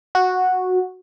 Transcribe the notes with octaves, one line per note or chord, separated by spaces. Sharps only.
F#4